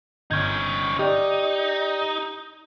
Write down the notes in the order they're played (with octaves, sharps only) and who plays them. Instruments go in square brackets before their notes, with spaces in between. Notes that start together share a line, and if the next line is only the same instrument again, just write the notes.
[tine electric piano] G1 G6 G#6 [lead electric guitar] C#4 D#4
[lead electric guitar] D#4 [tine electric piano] G4 D5